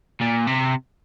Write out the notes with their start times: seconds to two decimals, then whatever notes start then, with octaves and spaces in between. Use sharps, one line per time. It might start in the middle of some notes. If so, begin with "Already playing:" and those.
0.21 A#2
0.47 C3